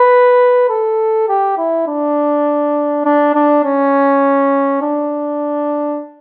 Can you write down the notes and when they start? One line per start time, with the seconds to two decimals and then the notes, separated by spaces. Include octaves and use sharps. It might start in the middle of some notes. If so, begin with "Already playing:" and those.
Already playing: B4
0.69 A4
1.28 G4
1.58 E4
1.87 D4
3.05 D4
3.34 D4
3.64 C#4
4.82 D4